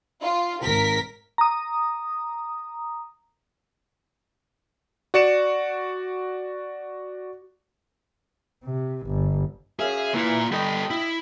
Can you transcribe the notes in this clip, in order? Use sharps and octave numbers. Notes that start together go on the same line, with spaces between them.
F4
G#1 A#4 B6
A#5 D#6
F#4 D5 C#7 E7
C3
G1
F#2 G#4 E5 F5
E3 A#3 F4
G3 A4 D#5 G5 B5
E4